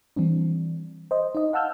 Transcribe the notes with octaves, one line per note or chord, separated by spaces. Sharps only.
E3 G3 C4 D4
C5 D#5
D#4 D#5
F5 F#5 A5 E6 F6 G6